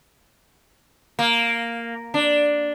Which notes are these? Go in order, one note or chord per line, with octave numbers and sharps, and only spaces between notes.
A#3
D4